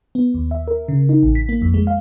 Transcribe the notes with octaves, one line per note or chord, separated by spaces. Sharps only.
B3
D#2
E5
A#4
C#3
D#4
A1
B6
A#3
F2
G#3
F5